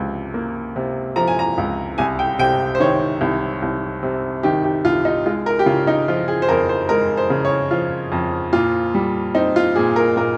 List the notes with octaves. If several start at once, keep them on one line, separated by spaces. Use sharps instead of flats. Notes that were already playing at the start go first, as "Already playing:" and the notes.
Already playing: C#2 C3 F3
A#3
C3
F3 A#5
G#5
A#5
C#2
C2 G#5
G5
C3 G5
C5
D#3 C#5
C2
C2
C3
D#3 G4
G4
C2 F4
D#4
G#3 F4
A#4
G4
C#3 F4
D#4
F3 F4
G#4
C5
F2 A#4
C5
G#3 A#4
C5
C#3
C#5
F3 F4
F2
A#2 F4
G3
C4 D#4
F4
A#2 G#4
A#4
A#2 A#4